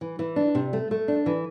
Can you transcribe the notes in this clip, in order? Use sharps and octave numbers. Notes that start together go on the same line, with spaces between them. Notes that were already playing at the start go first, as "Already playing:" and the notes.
E3
E3
D4
C3
A3
A3
D4
E3